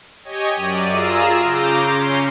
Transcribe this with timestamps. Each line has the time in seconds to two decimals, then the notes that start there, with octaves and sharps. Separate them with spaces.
0.25 G4 C#5 D#5 G#5
0.56 F#2 D5 D#7
0.90 F4 G#4 A#5 E6
1.44 C#3 A#5 D6 G6
1.83 C#4 C6